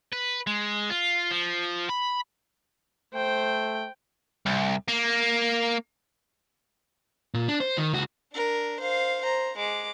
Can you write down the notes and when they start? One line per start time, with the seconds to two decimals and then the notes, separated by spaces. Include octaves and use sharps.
0.12 B4
0.47 G#3
0.90 F4
1.32 F3
1.89 B5
3.14 A3 C5 G5
4.46 C2
4.88 A#3
7.34 A#2
7.48 D4
7.60 C5
7.78 D#3
7.93 C#2 F#4
8.33 D4 A#4
8.80 C5 F5
9.21 C5 A#5
9.57 G#3 D6